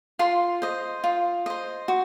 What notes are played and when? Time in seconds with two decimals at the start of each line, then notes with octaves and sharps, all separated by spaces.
0.19 F4 C6
0.62 C5 D#5
1.04 F4
1.46 C5 D#5
1.88 F#4